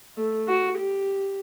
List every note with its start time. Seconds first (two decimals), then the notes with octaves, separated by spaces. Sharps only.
0.17 A3
0.48 F#4
0.78 G4